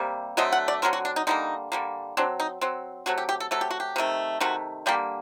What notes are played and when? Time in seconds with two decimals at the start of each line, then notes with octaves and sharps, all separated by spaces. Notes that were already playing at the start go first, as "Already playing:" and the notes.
Already playing: C3 G3 A#3
0.37 D3 F#3 A3 C4 D#5
0.52 F#5
0.68 D5
0.82 D3 F#3 A3 C4 A#4
0.93 F#4
1.05 D4
1.16 D#4
1.27 D3 G3 A#3 D#4
1.72 D3 G3 A#3
2.17 F#3 C4 D4
2.40 D#4
2.61 F#3 C4
3.06 C3 F#3 A3 F#4
3.18 G4
3.29 G4
3.40 A4
3.51 C3 F#3 A3 A4
3.61 G4
3.70 F#4
3.80 G4
3.96 C3 D#3 A3
4.40 C3 D#3 A3 F#4
4.86 D3 G3 A#3 G4